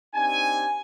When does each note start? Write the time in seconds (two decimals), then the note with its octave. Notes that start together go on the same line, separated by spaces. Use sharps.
0.15 C4 D4 D#4 G4 G#5